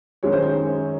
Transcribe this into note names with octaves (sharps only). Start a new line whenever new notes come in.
F#2 D#3 G#3 C#4 C#5
C5
C#5